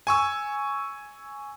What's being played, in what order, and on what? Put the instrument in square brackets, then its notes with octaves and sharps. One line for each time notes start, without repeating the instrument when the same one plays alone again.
[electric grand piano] G#5 C#6 E6